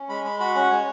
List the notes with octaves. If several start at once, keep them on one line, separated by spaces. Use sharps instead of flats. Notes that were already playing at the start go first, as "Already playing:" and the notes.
Already playing: C#4
G#3 B5
G#3 B5
F#4 B5
C#4 F#5
G#3 C#5